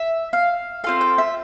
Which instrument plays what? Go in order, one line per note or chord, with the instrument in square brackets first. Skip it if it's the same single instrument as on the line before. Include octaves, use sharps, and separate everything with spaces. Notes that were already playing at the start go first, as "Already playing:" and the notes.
Already playing: [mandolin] E5
F5
C4 F4 A4 F5
G5
E5